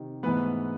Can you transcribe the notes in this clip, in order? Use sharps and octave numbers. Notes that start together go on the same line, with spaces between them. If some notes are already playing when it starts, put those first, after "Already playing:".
Already playing: C3 D#3
G#2 E3 A3 B3 B4